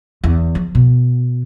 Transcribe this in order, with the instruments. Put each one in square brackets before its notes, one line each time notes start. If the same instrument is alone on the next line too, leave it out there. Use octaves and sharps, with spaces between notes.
[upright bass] E2
F3
B2